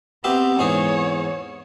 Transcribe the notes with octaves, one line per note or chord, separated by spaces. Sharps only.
B3 C4 G4 E5
E2 G#2 G#4 C#5